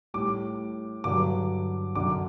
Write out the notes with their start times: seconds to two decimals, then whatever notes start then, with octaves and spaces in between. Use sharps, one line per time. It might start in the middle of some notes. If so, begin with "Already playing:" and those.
0.14 A2 G3 D6
1.04 G2 D3 F#3 D6
1.95 F#2 D3 F#3 D6